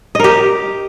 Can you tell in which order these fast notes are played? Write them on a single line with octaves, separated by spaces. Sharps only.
D#5 A#4 G4